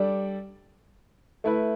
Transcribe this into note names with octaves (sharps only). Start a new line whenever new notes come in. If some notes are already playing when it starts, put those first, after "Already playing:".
Already playing: G3 D4 A4 D5
A3 E4 B4